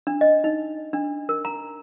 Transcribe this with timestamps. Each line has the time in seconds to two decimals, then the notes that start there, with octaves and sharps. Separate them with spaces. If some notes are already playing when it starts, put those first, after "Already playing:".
0.07 D4
0.21 D#5
0.44 D#4
0.93 D4
1.29 A#4
1.45 A#5